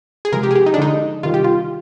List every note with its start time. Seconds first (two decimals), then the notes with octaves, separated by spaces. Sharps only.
0.25 G#4
0.32 C3 F3 G#3 A#4
0.43 G4
0.51 G#4
0.55 G4
0.66 D#4
0.74 D4
0.78 D3 F3 G#3 D#4
1.23 C3 D#3 G3 F4
1.34 G4
1.44 F4